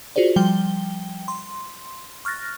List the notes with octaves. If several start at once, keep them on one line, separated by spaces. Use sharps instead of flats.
F4 F#4 G#4 C5 D5
F3 G3 G5 G7
C6
C#6 F6 F#6 A6 A#6